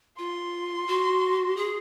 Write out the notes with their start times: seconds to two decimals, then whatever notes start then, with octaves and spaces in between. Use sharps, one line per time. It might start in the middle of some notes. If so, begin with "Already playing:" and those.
0.19 F4 C6
0.87 F#4
1.57 G#4